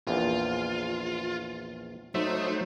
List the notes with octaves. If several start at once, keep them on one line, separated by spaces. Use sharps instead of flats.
A#1 E2 F4
F#3 A3 D#4 C5 E5